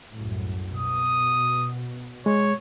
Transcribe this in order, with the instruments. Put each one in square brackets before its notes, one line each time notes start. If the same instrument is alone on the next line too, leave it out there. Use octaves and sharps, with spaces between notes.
[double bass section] C2 F#2 A2
[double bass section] B2 [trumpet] D#6
[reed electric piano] G#3 [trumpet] C#5